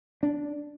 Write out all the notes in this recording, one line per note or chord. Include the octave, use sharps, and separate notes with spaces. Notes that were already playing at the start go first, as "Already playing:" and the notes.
D4